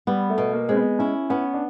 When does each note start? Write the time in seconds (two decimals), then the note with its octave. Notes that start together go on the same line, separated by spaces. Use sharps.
0.07 G3 B3
0.30 A3
0.38 B2
0.53 A#3
0.69 G#3 C4
0.76 B3
0.99 C#4 E4
1.30 B3 C#4
1.54 D4